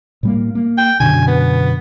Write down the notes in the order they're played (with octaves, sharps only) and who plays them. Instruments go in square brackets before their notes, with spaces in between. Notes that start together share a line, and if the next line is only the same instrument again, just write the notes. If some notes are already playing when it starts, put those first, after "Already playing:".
[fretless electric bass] A2 G3 A#3
A#3
[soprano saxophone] G5
[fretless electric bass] F#2 B2 D3 [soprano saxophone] G#5
[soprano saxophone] B3